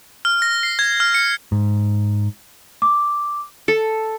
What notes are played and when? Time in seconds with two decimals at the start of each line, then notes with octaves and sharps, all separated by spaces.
0.25 F6
0.42 A#6
0.63 C7
0.79 G#6
1.00 F6
1.14 C#7
1.52 G#2
2.82 D6
3.68 A4